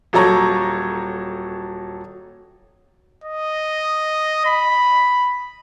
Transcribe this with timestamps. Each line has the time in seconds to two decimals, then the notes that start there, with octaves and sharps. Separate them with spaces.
0.13 D#1 F#3 A4 C#5 A#5 C#6
3.24 D#5
4.46 B5